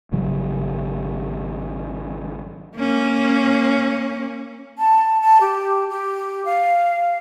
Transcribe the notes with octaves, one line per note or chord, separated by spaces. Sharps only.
G#1 C#3 F#3 G3
A#3 C#4
A5
A5
G4
G4
F5